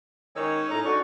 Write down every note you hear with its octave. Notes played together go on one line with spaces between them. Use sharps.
D#3 G#3 C#4 D#4 C#5 E6
A2 A#5
D4 F#4 A4 C#6